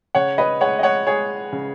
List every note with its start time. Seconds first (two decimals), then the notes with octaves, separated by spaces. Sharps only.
0.15 C#3 C#5 F#5
0.38 B4 D#5
0.60 G#3 C#5 F#5
0.79 D#5
0.83 C#5 F#5
1.07 G#3 G#4 C#5
1.52 C#3